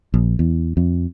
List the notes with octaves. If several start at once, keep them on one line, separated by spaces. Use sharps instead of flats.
A#1
E2
F2